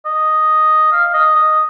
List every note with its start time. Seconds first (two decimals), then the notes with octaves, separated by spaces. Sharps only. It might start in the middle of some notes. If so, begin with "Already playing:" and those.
0.05 D#5
0.92 F5
1.13 D#5
1.35 D#5